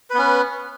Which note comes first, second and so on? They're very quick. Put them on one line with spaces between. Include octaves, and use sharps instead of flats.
B4 B3 C#4